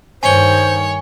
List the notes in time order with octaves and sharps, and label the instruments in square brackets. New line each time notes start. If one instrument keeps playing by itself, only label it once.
[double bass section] G2 D#3 [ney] C5 [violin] C#5 [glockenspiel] G#5 G7